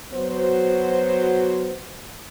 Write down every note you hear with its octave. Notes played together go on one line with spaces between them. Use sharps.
F#3 B3 F#4 C5